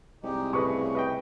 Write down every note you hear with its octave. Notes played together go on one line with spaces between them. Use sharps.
C2 G#3 D#4 G4
C#3 A3 G#4 B4 D#5 C#6
B4 D#5 G5